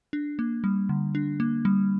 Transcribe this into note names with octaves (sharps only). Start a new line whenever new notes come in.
D4
A#3
G3
D3
D4
A#3
G3